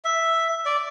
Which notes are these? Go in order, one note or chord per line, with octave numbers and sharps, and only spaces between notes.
E5
D5